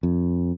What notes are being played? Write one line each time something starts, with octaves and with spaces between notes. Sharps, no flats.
F2